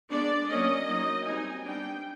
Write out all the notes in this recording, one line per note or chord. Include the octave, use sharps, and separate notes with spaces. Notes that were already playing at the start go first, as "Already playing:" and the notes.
G#3 B3 D4 D5
F#3 A#3 C#4 D#5
F#3 A#3 D#4
G3 C4 D#4 G#5
G3 B3 D4 G5